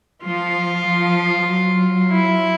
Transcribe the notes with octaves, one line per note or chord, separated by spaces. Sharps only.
F3 F4
F3
F#3
E4